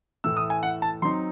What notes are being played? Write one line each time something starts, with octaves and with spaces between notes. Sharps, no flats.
A2 E3 A3 E6
D#6
G#5
F#5
A5
F#3 C4 D#4 C6